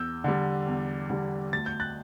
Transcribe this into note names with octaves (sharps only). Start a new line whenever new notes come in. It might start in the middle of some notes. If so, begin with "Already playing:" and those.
Already playing: E2 E6 G6
D3 G3
E2
D3 G3
D2 A6
G6
F#6 A6